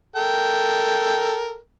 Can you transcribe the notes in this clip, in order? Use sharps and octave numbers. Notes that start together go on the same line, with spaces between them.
A4 A#4 G5